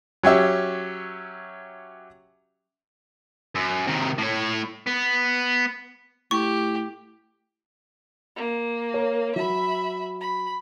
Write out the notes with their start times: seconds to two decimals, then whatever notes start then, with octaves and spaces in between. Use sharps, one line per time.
0.23 F#3 C#4 G4 E5
3.55 F#2
3.87 C3 D#3
4.18 A2 C#5
4.87 B3
6.31 A2 G4 C#6
8.36 A#3
8.94 A#4 C#5
9.36 F#3 E5 B5
10.20 B5